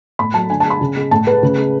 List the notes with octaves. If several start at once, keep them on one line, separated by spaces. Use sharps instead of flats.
A2 B5
F#3 A3 A5
D3 G#5
A5
G#3
B5
C#3
G#3
A2 A5
G#3 B4
C#3
G#3